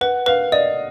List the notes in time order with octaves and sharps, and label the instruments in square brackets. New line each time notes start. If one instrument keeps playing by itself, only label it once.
[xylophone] B4 [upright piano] F#5
[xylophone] B4 [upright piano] F5
[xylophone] D5 [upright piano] D#5